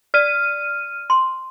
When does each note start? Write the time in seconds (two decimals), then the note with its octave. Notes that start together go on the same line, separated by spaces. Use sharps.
0.14 D5 F6 D#7
1.10 C6